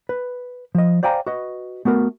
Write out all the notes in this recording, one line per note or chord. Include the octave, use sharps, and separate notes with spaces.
B4
F3 D#5
C5 D5 F5 G5 G#5 A#5
F#4 B4 D#5
A3 B3 F#4 A#4